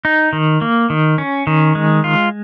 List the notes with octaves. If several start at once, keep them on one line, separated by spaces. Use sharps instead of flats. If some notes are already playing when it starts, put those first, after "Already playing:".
D#4
D#3
A#3
D#3
C#4
D#3
G#3
F4